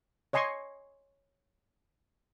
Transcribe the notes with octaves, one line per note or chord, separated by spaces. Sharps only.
C#5 D#5 G#5 C6 C#6